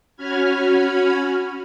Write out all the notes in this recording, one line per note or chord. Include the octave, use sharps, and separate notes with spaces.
C#4 F#4 B5 F6 G#6